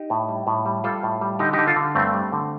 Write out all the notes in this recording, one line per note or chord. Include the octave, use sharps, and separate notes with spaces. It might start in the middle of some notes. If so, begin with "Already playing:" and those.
Already playing: D#4 G4
A2
G3
A2
G3
G3 F4 A4
A2
G3
D3 D#4 G4
D3 D#4 G4
F4 A4
D3
G2 A3 C4
G3
D3